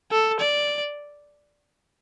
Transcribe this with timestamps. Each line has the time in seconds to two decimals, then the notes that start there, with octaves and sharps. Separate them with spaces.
0.11 A4
0.40 D5